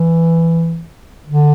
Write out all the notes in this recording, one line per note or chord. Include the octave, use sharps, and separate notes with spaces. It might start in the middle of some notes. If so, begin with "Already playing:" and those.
Already playing: E3
D3